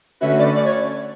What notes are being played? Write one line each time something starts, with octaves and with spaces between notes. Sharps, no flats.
D3 A3 C#4 F#4 B4 E5
D5
D5
C#5